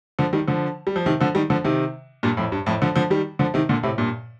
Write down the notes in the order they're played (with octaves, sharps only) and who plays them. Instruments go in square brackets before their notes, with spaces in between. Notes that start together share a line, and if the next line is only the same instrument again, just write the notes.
[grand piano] D3 F3
D#3 G3
D3 F3
G3
F3
C3 D#3
D3 F3
D#3 G3
D3 F3
C3 D#3
G2 A#2
F2 A2
G2
F2 A2
D3 F3
D3 F3
D#3 G3
D3 F3
C3 D#3
A#2 D3
A2 C3
G2 A#2